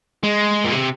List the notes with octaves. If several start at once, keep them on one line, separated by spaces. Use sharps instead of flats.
G#3
A#2
C3